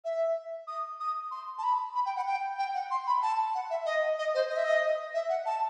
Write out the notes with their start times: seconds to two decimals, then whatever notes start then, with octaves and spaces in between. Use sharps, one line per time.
0.05 E5
0.67 D#6
1.00 D#6
1.31 C6
1.58 A5
1.63 B5
1.95 B5
2.06 G5
2.16 F#5
2.27 G5
2.59 G5
2.74 F#5
2.91 C6
3.07 B5
3.22 A5
3.55 F#5
3.70 E5
3.86 D#5
4.19 D#5
4.35 C5
4.50 D#5
4.57 E5
4.64 D#5
5.14 E5
5.29 F#5
5.46 A5